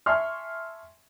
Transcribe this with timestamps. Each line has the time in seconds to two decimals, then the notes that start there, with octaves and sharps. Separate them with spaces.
0.06 E5 G#5 A5 C6 C#6 F6